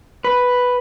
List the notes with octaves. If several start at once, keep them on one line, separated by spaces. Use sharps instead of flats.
B4